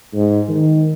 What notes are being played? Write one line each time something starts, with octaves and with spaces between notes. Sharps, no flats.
G#2
D#3